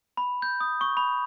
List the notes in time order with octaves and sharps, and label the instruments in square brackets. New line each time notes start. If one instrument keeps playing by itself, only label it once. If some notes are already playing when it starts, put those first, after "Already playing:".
[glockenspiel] B5
G6
D#6
C#6
B5